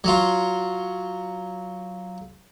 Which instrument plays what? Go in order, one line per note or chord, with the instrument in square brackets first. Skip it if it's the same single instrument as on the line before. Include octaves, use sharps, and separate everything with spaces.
[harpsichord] F#3 F4